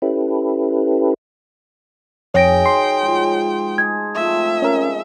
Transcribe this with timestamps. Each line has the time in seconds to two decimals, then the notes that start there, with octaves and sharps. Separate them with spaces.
0.02 C#4 E4 G4 A4 B4
2.34 F2 D#3 F#4 G#4 C#5 G5 A#6 D7
2.66 C6
3.02 G#2 F3 F4
3.78 D#4 G#4 A5 G#6
4.15 F3 A3 C4 E5
4.62 G#3 C#4 A#4